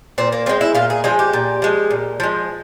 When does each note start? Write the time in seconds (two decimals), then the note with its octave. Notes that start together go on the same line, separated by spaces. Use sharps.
0.18 A#2 C4
0.32 A#3
0.46 F3 G#3 C4
0.61 E4
0.74 A#2 F4
0.90 G#4
1.04 F3 G#3 G#4
1.19 G4
1.33 A#2
1.62 F3 G#3
1.91 A#2
2.20 F3 G#3